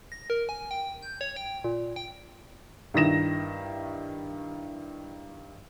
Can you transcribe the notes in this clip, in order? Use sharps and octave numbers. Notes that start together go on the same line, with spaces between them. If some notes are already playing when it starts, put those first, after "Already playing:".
A#6
A#4
G#5
G5
G6
C#5
G5
A#2
G5
G2 D#3 E4 A#6 E7